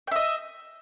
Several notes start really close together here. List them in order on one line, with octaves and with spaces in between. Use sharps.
G5 E5 D#5